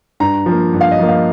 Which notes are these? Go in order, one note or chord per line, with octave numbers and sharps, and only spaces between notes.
G2 A#5
F3
A#3
G2
F5
D#5
F3 A#3
F5